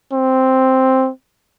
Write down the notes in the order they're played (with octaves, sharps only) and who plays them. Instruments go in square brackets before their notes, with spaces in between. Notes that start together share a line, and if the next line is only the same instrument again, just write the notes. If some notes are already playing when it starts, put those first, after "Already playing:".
[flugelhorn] C4